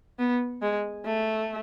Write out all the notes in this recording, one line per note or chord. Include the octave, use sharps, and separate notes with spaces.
B3
G#3
A3